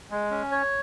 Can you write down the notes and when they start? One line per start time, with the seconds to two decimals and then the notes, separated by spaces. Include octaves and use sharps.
0.11 G#3
0.30 C#4
0.52 C#5